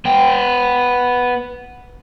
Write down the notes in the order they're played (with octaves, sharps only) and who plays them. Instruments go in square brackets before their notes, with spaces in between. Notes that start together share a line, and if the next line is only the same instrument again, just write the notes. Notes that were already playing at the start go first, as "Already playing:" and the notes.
[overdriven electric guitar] B3 G5